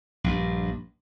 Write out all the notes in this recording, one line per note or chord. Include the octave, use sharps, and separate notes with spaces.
A#1 G2